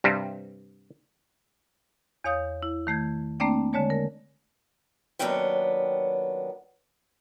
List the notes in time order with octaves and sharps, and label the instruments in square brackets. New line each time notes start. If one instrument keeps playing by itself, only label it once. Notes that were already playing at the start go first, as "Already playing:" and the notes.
[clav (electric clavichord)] G2 C3 G3
[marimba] E2 C#5 F5 D#6 G6
E4
D#3 A3 G6 G#6
A3 A#3 C4 D4 D5 G5
D3 G#3 C#5 A5
A#4
[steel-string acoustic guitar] D#2 F#3 B3 C#4 D4 G5